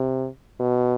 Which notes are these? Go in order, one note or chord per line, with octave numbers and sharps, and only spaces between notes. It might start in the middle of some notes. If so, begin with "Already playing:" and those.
Already playing: C3
B2